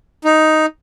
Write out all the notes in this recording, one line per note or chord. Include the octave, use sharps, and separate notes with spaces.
D#4